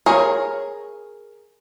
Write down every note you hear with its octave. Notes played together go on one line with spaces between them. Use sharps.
G#4 A#4 C#5